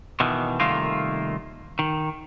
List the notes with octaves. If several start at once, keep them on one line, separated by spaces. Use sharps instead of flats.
B2 D#3 E3
C2 D#3 A3 A#3 F4
D#3